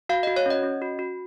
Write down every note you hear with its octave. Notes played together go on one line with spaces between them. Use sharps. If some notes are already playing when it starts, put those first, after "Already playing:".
F#4 F5
F#4 D#5
C#5
C#4 D#5
C#4
F#4
F#4